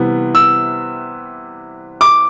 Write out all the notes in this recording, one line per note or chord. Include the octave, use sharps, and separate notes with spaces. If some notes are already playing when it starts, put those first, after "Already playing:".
Already playing: C3 E3 G3 B3
E6
D6